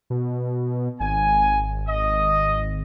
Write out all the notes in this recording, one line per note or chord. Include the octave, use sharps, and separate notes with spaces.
B2
G#1 G#5
D#5